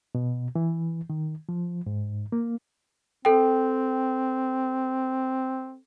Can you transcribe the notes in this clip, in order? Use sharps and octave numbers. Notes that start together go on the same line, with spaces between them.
B2
E3
D#3
F3
G#2
A#3
C4 A4 G5